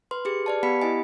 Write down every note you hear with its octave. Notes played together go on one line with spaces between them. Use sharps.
B4 C6
G4 G#4 C#7
B4 D5 A5
B3 G4 F#5 B5 B6 C#7
E4 D#5 G#5